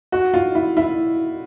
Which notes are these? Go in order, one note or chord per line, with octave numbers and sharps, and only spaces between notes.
F#4
F4
E4
E4